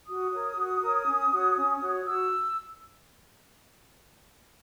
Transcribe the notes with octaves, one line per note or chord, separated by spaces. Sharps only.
F#4 D#6
A#4 C#5
F#4
A#4 C#5
C#4
F#4 C#5
C#4
F#4 C#5
F#4 E6